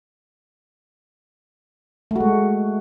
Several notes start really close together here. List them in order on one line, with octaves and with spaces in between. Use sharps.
A3 F#4 G#3